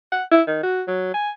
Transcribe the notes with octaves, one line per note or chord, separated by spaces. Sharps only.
F#5
E4
D#3
F#4
F#3
G#5